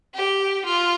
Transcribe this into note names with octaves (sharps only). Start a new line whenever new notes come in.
G4
F4